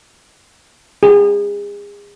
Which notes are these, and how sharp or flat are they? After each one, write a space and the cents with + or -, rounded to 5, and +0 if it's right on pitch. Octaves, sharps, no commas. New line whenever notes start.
G#4 -35